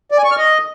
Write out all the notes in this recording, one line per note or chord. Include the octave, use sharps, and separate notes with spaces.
D5
G#5
C#6
F6
D#5